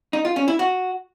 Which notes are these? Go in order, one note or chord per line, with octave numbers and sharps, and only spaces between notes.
D#4
F4
C#4
E4
F#4